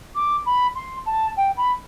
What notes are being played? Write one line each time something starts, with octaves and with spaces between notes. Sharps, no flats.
D6
B5
C6
A5
G5
B5